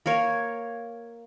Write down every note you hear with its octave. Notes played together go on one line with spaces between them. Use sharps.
A#3 A#4 C#5